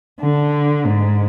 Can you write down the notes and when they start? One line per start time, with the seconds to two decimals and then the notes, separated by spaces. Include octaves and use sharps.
0.21 D3
0.86 G#2